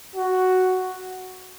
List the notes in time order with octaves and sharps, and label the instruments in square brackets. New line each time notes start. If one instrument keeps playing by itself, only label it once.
[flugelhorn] F#4